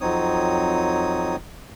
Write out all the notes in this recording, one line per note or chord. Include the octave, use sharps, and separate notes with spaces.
F2 F#3 C4 D#4 C#5 D#6